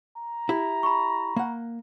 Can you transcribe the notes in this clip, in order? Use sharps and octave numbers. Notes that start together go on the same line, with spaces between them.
A#5
E4 G4
B5 C#6
A#3 F#5